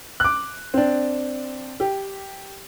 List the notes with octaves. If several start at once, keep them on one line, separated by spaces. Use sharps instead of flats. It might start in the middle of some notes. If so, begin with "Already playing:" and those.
D6 F#6
C4 D4
G4